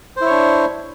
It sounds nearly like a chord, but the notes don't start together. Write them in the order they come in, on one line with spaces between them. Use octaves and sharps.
C5 E4 C#5 D4